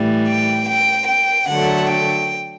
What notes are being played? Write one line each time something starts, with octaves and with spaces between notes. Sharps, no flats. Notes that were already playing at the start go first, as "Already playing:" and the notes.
Already playing: A2 E3 G3
G5
G5
G5
D3 F#3 A3 F#5
G5